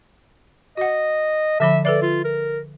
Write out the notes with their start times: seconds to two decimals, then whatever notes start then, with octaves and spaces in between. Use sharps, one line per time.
0.77 F#4 D#5 F#5
1.60 D3 F3 E5 B5
1.85 A4 B4 D5 E5
2.02 F4
2.25 A#4